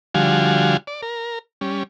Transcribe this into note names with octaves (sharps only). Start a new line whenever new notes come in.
D3 F3 G3 F#4 F5 G#5
D5
A#4
G3 C#4